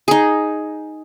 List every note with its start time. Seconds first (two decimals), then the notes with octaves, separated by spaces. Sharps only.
0.08 D#4 G#4